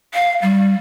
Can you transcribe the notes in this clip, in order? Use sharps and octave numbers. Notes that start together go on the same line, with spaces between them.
F5
G3